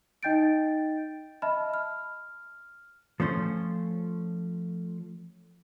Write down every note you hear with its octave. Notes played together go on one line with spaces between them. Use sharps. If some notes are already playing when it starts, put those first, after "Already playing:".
D#4 D#5 G5 G6 A6 D7
D#5 E5 A5 B5 F6
F6
F3 A3 C#4 C5